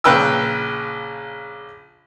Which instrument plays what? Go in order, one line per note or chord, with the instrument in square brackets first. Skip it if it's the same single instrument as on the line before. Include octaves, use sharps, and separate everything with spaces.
[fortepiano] A#1 C#3 B4 G5 E6